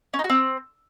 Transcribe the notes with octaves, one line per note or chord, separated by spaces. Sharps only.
C#4
D#4
F#4
C4